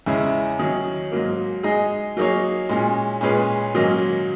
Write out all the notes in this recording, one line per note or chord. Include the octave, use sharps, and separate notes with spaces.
E2 C#3 G#3 C#4 E4
D#3 F#3 C#4
G#2 F#3 A#3
G#3 D#4 G#4 D#5
F#3 A#3 D#4 G#4 C#5
A#2 G#3 C#4
A#2 G#3 C#4 G#4 B4
G#2 D#3 F#3 A#3 C#4